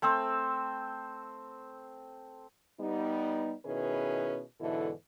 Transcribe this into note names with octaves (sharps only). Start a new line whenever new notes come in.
A3 C4 C5 E6
G3 B3 D#4
B2 D#3 C#4 E4 G#4 B4
G#2 B2 D3 E3 E4 A4